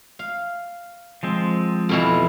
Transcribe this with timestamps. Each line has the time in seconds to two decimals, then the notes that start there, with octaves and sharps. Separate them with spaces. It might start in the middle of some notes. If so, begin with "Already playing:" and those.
0.19 F5
1.23 F3 G#3 C4
1.89 F2 B2 E3